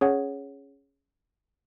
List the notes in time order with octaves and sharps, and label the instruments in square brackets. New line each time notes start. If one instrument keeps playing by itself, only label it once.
[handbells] C#4 G#4 C#5 F#5